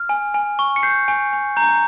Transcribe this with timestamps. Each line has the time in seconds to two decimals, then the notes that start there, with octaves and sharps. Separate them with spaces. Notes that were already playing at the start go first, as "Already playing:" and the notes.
Already playing: F6
0.09 G#5
0.34 G#5
0.59 C#6
0.76 C#7
0.83 G6 C7
1.08 G#5
1.33 G#5
1.56 A#5 G6